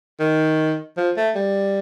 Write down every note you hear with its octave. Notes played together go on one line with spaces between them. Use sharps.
D#3
F3
A3
G3